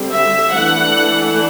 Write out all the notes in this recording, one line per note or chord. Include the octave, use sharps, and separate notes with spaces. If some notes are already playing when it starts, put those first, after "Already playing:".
Already playing: D3 G3 C4
E5
E3 A3 D4 F#5